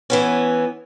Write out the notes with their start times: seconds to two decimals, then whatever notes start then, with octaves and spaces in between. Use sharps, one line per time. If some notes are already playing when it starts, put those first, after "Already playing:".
0.10 E3 B3 C#4